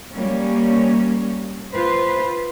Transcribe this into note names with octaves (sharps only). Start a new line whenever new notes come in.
G3 A#3 C#4
F4 B4 C5